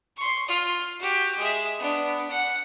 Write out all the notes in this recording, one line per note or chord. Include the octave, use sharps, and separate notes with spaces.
C6 C#6
F4
F#4 G4
G#3 E5
B3 D4
F#5